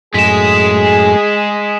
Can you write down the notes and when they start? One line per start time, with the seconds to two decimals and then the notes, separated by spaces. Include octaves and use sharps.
0.14 F#2 A2 G#3 G#4 B6 E7